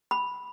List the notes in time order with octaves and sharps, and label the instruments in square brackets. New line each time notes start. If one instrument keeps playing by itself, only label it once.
[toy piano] B5